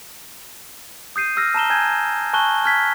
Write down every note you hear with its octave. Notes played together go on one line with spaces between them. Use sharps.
D#6 G6 C7 D#7
E6 F6 A#6
A5 A#5 E7 G7
G#5 G6 G#6
G#5 A5 C#6 F#6 G7
F6 F#6 G#6 B6